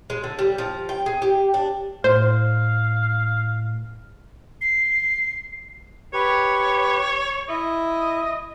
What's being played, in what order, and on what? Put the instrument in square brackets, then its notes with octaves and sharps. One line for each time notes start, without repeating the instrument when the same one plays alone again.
[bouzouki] G#3
D3
G3
F3
G5
G#4
G4
D4
[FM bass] A2 [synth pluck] C5 [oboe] F5
[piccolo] C7
[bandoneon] G4 B4 [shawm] C#5
[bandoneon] E4 E5 [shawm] D#5